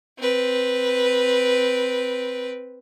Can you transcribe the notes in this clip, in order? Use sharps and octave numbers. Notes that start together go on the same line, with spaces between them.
C4 B4